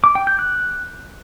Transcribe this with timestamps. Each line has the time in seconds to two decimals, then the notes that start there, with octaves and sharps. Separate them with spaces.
0.04 D6
0.15 G5
0.27 G6
0.39 F#6